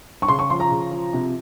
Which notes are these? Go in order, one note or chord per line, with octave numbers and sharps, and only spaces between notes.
C#6
C#3 C6
C#6
F3 C6
A#5
C#3
F3
C3